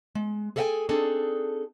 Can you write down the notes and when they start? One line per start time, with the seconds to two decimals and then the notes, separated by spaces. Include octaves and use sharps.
0.15 G#3
0.56 G#4 A4 D5 E5 G5 G#5
0.89 C4 D4 D#4 G#4 A4